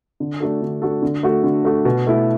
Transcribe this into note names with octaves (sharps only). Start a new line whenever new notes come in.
D3
A3 D4 F#4 A4
D3
A3 D4 F#4 A4
D3
A3 F#4 A4
D3
A3 F#4 A4
B2
A3 E4